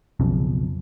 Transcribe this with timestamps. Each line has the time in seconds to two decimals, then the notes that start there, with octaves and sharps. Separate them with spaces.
0.20 B1 F2 C#3